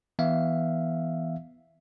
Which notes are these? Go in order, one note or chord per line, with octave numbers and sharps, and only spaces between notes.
E3 B3 E5 F5